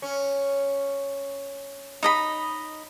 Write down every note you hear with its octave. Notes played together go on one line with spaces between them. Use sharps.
C#4
D#4 D#5 B5